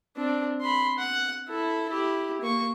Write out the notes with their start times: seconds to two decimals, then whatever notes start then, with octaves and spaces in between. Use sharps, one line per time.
0.16 C4 D4
0.61 B5 C6
0.98 F#5
1.49 E4 A4
1.90 E4 G4
2.41 A#3 C#6